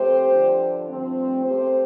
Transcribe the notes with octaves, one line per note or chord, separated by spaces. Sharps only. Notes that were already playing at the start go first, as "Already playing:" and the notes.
Already playing: F2 C3 A3 C4 G4 C5
G2 D3 F3 D4
G2 F3 A3 C4
C3 A3 C4 G4 C5